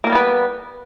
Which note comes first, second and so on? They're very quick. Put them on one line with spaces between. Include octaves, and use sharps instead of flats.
A#3 A#4 G3 B3 B4